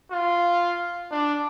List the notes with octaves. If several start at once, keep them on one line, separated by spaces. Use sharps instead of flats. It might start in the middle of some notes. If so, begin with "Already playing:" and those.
F4
D4